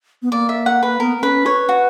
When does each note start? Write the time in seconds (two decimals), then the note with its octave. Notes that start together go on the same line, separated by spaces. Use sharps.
0.22 B3
0.32 A#3 D5
0.49 E5
0.66 F#5
0.83 B4
1.00 B3 A#4
1.18 B3
1.23 C#4 B4
1.46 B4 C#5
1.69 F#4